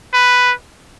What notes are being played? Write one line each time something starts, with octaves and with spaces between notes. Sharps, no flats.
B4